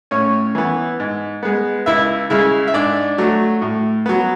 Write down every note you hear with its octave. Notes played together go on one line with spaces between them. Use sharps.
A2 C#4 C#5
E3 B3
G#2
G#3 B3
C#2 E4 E5
C#3 G#3 E4 E5
E5
G#2 D4 D5
F#3 A3
A2
F#3 B3